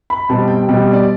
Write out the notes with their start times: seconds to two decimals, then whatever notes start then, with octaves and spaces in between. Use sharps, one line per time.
0.10 B5
0.29 B2 G3 C4 A5
0.48 G5
0.68 B2 G3 C4
0.93 D5